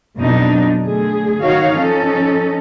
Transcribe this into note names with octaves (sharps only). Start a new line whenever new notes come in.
F2 B2 F#3 B3 D4 D#4
D3 A3 G#4
D#3 D#4 F#4 C#5 F5
F3 C#4 D#4 A4